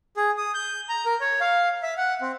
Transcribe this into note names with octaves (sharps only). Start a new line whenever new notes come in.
G#4
D#6
G6
A#5
A#4
C#5
F5
E5
F#5
C4